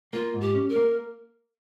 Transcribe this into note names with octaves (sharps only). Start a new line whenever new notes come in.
A#3 F4
G#2
G4
C#4
A#4
A#3